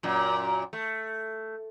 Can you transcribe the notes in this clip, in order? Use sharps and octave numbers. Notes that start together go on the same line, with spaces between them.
F#2 A#2
A3